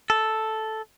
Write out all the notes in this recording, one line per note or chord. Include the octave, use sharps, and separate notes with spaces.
A4